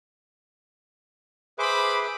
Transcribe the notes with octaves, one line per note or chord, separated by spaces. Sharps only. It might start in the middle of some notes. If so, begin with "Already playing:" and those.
G#4 B4 C5 E5 B5 D6